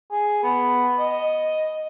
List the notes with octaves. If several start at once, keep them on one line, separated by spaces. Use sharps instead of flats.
G#4
B3
D#5